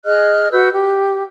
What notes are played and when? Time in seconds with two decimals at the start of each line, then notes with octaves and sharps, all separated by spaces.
0.05 G#4 D#5 F6 F#6
0.52 F#4 B4 E6 G6
0.73 G4